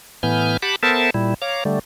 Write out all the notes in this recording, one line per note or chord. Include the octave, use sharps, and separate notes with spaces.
A2 E3 B3 G#5 F6 G6
G4 F#5 A5 B5 D6
B3 A4 A#4 C5 E5 A5
A#2 G3 E4
C#5 F5 A#5 D6
D3 G3 A3